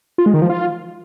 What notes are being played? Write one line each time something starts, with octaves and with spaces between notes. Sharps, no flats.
F4
G#3
D#3
F3
F4